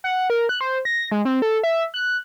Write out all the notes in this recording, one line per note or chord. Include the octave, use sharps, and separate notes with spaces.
F#5
A#4
F#6
C5
A#6
G#3
C4
A4
E5
F#6